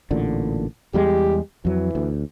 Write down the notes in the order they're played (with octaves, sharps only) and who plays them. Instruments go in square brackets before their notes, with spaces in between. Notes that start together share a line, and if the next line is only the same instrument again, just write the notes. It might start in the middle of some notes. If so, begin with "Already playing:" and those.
[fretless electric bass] A1 A#2 D3
[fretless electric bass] E2 G3 G#3 [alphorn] G4
[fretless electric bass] F2 F#3 [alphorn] E3
[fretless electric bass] D2